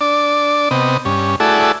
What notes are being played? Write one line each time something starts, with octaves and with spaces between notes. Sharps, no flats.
D4 D5
C3 B3 D#5
G2 C#4
A3 E4 F#4 G#4 A4 D5